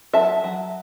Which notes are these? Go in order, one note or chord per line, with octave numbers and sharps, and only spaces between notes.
F#3 E5 A5
F#3